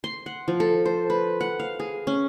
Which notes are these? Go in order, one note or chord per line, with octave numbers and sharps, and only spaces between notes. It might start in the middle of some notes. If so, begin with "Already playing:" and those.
C6
F#5
F3
A4
C5
B4
F#5
F5
G#4
C#4